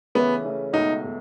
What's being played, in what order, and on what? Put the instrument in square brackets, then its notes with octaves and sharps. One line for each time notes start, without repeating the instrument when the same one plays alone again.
[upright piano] C#3 E3 A3 C#4 [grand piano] B3
[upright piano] C#3 E3 A3 C#4
[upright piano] C#2 B2 A3 [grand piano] D#4
[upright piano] B2 A3